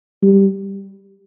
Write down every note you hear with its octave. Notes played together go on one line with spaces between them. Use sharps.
G3